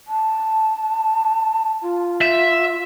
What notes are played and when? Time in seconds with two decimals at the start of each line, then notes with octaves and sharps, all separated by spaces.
0.08 A5
1.82 F4
2.22 E5